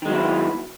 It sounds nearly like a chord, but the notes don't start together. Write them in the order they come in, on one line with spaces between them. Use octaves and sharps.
D#3 G#3 F#3 B3 E4